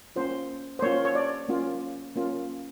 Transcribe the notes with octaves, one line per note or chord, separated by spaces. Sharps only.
A#3 C#4 F4 C5
C5
A#3 C#4 F4 C#5
C#5
D5
A#3 C#4 F4
A#3 C#4 F4